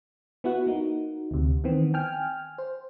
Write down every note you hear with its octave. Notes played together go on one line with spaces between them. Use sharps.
B3 E4 F#4 F#5
A#3 D#4 F#4
D2 C3
D#3 E3 B3 C4
G5 G#5 F6
C5